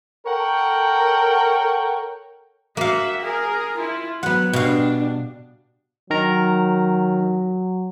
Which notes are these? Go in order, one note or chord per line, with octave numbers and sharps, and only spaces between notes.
A4 A#4 C#5 F#5 G5
A#3 F#4 E5 F5
G#4 A#4
E4 F4
F#3 B3 F#5
B2 G3 D4 F5
D#3 F#3 A#4 A#5